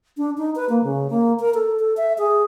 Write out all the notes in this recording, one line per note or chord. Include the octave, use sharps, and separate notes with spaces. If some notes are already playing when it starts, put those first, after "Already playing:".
D4
D#4
B4
A#3
C#3
A#3
A#4
A4
A4
E5
G#4